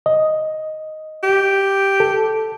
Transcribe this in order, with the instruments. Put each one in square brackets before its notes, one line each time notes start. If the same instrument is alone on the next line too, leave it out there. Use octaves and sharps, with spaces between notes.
[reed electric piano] D#5
[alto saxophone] G4
[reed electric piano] A4